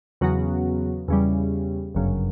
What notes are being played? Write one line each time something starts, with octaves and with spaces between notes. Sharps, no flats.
E2 C#3 F#3 B3 F#4
E2 C#3 G3
G1 F#2 C#3